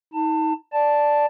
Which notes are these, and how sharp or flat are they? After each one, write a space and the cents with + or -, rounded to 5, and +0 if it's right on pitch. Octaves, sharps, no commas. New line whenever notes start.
D#4 +35 A5 +25
D5 +0 A5 +0